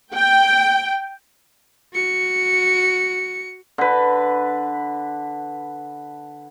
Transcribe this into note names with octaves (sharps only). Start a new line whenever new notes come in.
G5
F#4 C#7
D3 B4